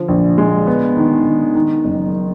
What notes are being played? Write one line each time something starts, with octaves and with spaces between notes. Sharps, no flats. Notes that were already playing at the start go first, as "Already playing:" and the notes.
Already playing: D3 F3
A#1
G#3
B3
D#3
D#3
D#3
F#1